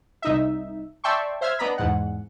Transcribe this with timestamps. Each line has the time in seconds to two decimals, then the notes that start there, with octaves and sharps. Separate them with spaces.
0.22 C2 D#4 E5
1.04 D5 E5 G5 A5 C6 C#6
1.41 C5 E5 F6 G#6
1.59 B3 D4 D#5 A#5 B5
1.78 E2 G#2 F#5